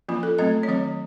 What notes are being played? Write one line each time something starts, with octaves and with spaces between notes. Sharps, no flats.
F3 A#3 C#4 F4
A4
F#3 A3 C4 D#5
C#5
D#3 F#3 C4 D#5